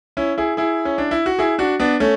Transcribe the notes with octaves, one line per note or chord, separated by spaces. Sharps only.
C#4 E4
E4 G#4
E4 G#4
C#4
D4
E4
F#4
E4 G#4
D4 F#4
B3 D4
A3 C#4